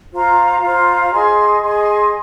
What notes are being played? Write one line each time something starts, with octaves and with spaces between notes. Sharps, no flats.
F4 C5 F5 A#5
F4 C5 F5 A#5
G#4 D#5 G#5 C6
G#4 D#5 G#5 C6